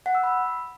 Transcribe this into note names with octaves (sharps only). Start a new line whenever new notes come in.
F#5
E6
B5